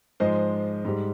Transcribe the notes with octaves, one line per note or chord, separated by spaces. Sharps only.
G#2 F3 G#3 C5 D#5
G#2 G3